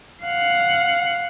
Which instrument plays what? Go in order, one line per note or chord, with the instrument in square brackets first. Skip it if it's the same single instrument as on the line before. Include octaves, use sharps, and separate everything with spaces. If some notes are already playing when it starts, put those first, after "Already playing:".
[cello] F5 F#5